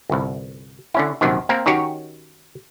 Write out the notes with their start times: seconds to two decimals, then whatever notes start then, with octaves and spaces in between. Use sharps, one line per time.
0.10 G1 C2
0.94 D3 C#4 E4
1.21 A#1 F#2 C3 D#3
1.49 A#3 C4 A#4
1.66 D#3 C#4 D#4 F#4 G4 C#5